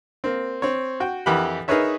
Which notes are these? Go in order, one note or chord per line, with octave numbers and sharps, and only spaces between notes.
A#3 C4
C4 C#5
F#4 G5
F2 E3 G4 A#4 F#5 B5
D#4 G#4 A#4 B4 C#5 E5